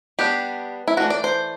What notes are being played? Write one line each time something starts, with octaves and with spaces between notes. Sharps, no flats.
G3 B3 D4 G4
E4
E3 A3 D4 F#4
D5
C5